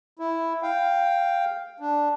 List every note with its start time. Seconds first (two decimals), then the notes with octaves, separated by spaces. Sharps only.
0.19 E4
0.62 F5 G5
1.80 D4